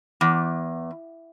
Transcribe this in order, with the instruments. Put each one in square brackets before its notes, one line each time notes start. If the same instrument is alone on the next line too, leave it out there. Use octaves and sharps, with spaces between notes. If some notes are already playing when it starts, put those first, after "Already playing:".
[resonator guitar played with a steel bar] E2